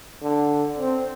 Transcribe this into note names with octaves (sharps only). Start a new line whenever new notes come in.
D3
C4